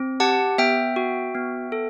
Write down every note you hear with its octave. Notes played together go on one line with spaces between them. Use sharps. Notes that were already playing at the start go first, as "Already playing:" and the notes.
Already playing: C4
G4 F#5 A5
B3 E5 G5
F#4
B3
A4